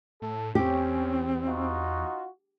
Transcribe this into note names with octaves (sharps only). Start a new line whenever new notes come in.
A2 A4
E2 C4 C#4 G4
D#4 F4 F#4